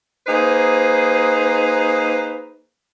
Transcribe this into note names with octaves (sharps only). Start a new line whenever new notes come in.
A#3 D#4 G#4 B4 C5